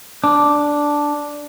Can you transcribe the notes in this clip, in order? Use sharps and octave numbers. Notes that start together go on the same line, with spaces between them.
D4